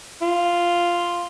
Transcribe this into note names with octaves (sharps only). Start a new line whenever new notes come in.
F4